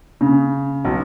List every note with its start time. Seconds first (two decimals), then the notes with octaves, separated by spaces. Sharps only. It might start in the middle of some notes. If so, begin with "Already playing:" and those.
0.21 C#3
0.85 B1